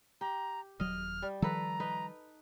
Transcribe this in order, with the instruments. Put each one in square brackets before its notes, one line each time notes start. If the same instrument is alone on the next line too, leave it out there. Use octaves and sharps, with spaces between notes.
[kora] G4 [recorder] A#5
[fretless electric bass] D#1 F#3 [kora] D#5 [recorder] F6
[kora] G3
[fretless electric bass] D#3 F3 G3 [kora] A4 B4 [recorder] A#5
[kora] D#4 B4